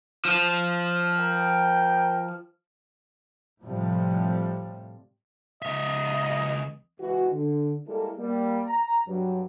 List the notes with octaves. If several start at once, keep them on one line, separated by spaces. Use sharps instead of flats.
F3
A#4 G5
A2 C3 F3 G3
C#2 D#5 E5
C#2 E3 G#3 F#4
D3
G3 G#3 A#3 E4 A4
G3 A#3
A#5
G2 F#3